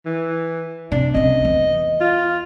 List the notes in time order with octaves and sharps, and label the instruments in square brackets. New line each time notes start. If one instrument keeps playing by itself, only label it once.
[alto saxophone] E3
[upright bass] C3 [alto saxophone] D4
[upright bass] C2 C#3 [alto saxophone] D#5
[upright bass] E2
[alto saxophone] F4